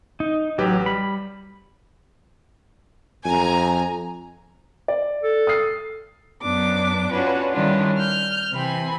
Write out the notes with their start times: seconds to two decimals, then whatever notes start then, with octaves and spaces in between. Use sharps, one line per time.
0.20 D#4
0.58 A1 F#3 G4 B4
0.86 G3 B5
3.25 F2 G#5 A#5
4.88 D5
5.23 A4
5.47 D#6 F6 C7
6.42 F#2 B3 D4 D6
7.12 C#4 D4 F4 F#4 B4
7.51 D#3 G3 C#4 D4 E4 F4
7.97 F6 G6
8.52 C3 E3 C4 G#5 B5